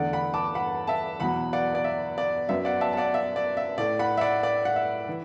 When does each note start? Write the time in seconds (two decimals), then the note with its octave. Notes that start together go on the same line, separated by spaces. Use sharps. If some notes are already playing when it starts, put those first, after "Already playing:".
Already playing: E2 D3 A3 D5 F#5
0.13 F#5 B5
0.34 A5 D6
0.55 F#5 B5
0.87 E5 A5
1.20 E2 B2 F#3 F#5 B5
1.53 D5 F#5
1.75 D5
1.84 E5
2.18 D5
2.49 F#2 F#3 B3 E5
2.65 D5 F#5
2.81 E5 A5
2.93 A5
2.97 D5 F#5
3.14 E5
3.36 D5
3.57 E5
3.78 A2 A3 D5
3.99 F#5 B5
4.17 E5
4.21 D5 F#5
4.43 D5
4.65 F#5
4.76 E5
5.09 E3